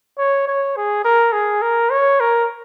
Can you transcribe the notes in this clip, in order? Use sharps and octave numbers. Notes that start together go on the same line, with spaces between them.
C#5
C#5
G#4
A#4
G#4
A#4
C#5
A#4